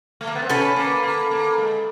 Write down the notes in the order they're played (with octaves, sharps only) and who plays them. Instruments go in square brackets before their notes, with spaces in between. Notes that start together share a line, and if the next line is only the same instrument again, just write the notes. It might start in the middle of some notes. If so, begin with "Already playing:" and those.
[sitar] A3
A#3
B3
C4
[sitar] C#4 [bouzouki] A4 B4
[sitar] A#3
A#3
A#3
G#3